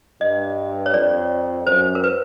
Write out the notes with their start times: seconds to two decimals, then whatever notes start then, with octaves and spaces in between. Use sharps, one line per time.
0.21 G2 D#5
0.86 C#5
0.94 F2 D5
1.67 F#2 C5
1.95 A#4
2.04 B4